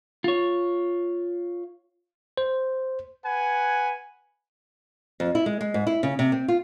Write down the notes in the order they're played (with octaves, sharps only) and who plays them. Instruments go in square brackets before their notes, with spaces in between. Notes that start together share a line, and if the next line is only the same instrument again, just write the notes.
[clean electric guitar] F4 C#5
[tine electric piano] C5
[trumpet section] B4 F#5 G#5
[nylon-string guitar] F2
E4
G#3
G#3
G#2
E4
C#3
C3
C4
F4